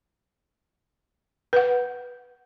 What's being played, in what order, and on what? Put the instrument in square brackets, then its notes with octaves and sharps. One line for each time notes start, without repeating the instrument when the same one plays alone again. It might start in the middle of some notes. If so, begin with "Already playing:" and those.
[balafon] B4 F#5